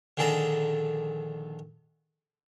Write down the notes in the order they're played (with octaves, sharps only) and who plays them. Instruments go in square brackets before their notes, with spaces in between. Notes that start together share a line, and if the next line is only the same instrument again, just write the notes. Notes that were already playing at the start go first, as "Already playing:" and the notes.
[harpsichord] A#1 D3 D#3 G#4 A4 A#5